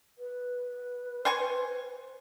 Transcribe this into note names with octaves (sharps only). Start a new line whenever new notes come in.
B4
C5 G#5 C#6